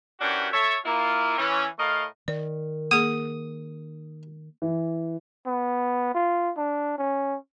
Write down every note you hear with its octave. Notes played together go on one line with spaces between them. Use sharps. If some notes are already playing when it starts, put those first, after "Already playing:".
F#2 E3 C#4 D4 F#4 G4
A4 C#5 E5
A#3 E4 F4
E3 C#4
A2 A3 A#4 D#5 F5
D#3 D5
A#3 G#4 D#6
E3
B3
F4
D4
C#4